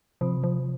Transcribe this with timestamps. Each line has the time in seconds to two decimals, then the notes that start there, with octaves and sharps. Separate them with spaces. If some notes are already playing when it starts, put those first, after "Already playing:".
0.21 C3 F3
0.43 F3